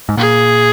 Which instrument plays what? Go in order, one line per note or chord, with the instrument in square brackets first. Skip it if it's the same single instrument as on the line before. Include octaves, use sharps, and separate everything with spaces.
[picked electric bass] G#2
[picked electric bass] A#2 [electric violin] G#4